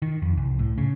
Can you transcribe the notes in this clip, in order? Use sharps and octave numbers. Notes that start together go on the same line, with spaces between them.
D#3
F2
C2
A2
C#3